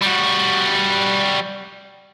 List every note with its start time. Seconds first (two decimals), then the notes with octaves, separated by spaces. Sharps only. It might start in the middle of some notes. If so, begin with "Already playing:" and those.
0.02 G3 F#4